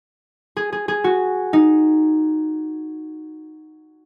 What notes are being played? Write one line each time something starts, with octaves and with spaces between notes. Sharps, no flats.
G#4
G#4
G#4
F#4
D#4